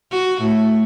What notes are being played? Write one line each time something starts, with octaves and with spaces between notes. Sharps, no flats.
F#4
A2